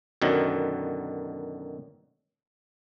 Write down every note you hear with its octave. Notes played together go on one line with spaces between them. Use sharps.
F#2 B2 D3 D#3